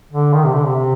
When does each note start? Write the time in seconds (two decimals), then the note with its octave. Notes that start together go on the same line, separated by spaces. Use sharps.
0.13 D3
0.34 D#3
0.44 C3
0.54 D3
0.65 C3
0.76 C3